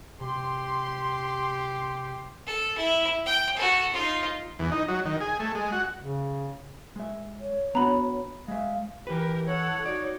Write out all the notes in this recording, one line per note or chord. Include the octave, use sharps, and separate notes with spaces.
C3 G4 C6
A4
E4
G5
F#4 A4
D#4 F4
E2
D#4
F#3
D#3
G#4
A3
G#3
F#4
C#3
G#3 E5
C#5
B3 D4 F#4 A#5 B5
G#3 E5 F5
E3 G4 A#4 B4
A4 C#5 F#5
D#4 F#4 D5